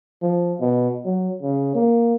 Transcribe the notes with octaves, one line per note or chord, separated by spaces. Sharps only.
F3
B2
F#3
C#3
A#3